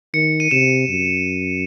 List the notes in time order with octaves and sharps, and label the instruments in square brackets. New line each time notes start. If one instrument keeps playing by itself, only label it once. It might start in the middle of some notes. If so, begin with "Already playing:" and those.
[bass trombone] D#3 [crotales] C#7
[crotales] D#7
[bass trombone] C3 [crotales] E7
[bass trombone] F#2